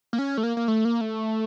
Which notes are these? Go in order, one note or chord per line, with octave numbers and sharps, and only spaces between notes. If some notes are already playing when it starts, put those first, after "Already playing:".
A#3
C#4
A3
A#3
A#3
A3
A#3
A3